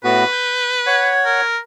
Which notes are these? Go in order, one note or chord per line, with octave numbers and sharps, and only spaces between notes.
A2 B3 F#4 B4
G6
C#5 F#5 G#6
A#4